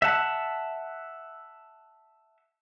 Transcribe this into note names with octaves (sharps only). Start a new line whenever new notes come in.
E5 F#5 A5